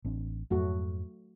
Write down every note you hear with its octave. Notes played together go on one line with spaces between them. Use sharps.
A1 C4 D4
F2 G#2 F#3 A3 F#4